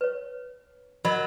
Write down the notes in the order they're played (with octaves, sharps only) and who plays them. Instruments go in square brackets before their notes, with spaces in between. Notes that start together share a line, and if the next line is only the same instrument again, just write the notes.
[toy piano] B4 C#5
[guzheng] F#3 [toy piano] A#4 D#5 B5